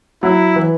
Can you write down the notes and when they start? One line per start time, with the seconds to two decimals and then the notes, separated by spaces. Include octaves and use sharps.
0.23 F#3 E4
0.56 E3